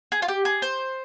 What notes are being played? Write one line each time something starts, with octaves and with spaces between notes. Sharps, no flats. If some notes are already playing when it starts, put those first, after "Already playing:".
G#4
F4
G4
G#4
C5